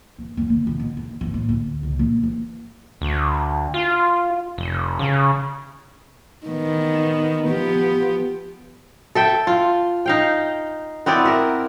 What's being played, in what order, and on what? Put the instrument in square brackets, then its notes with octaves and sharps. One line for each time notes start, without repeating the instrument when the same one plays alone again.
[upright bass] G2
F#2
D3
D3
B2
G#1
G1
A1
D2
C#2
A#1
E3
[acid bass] D2
F4
F1
C#3
[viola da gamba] D#3 B3
F3 B3 G4
[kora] A4 E5 G5
F4
D#4 F5 G5
B3 C4 E4 D5
A#4 E5 F#5